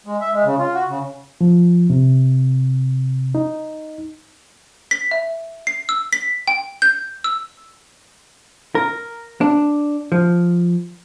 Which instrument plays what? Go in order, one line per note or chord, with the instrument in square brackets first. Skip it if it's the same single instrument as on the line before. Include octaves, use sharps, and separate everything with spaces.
[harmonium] G#3
E5
G#3
C#3
F4
F#4
C#3
[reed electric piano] F3
C3
D#4
[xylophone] B6
E5
C7
E6
B6
G5
G6
E6
[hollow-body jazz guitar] A#4
D4
F3